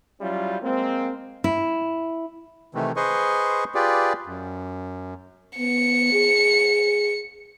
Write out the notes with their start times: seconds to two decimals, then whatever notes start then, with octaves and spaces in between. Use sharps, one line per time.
0.21 F#3 G3 C#4 E4 F4
0.62 G#3 A#3 C4
1.44 E4
2.75 C3 D#3 E3 A3
2.96 G#4 B4 C5 D#5 C6 C#6
3.75 F4 G4 G#4 B4 D5
4.26 F#2
5.59 B3 C#7
6.13 G#4